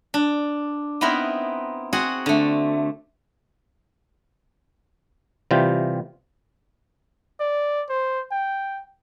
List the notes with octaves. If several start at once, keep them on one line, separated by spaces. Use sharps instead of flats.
D4
B3 C4 D#4 E4 A#4 B4
C4 F#4 G#4 F#5
D3 A3
C3 E3 G3 F4 G5
D5
C5
G5